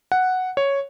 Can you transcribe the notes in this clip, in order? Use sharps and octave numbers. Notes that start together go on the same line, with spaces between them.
F#5
C#5